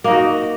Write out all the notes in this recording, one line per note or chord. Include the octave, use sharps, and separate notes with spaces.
A#3 D#4 F#4